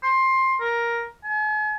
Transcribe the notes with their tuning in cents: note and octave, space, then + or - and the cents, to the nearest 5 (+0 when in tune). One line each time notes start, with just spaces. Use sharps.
C6 +15
A#4 +10
G#5 +45